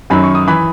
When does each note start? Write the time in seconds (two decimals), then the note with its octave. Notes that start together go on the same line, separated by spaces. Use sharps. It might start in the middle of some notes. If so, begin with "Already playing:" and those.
0.10 F#2 D#3 F#3 B5
0.23 C#6
0.35 D#6
0.48 E3 B5